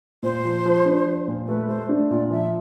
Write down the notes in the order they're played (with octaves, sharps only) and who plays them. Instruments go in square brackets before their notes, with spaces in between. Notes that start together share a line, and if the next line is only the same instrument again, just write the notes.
[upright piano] A#2 [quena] C5
[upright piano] F3
F3
D4
F3
A#2
[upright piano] A3 [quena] B4
[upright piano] A3 [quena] C5
[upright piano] D4
[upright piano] A#2 [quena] D5
[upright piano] F3 [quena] E5